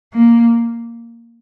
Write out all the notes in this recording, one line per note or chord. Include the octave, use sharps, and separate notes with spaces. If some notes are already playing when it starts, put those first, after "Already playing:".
A#3